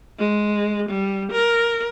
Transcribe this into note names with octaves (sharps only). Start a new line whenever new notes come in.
G#3
G3
A#4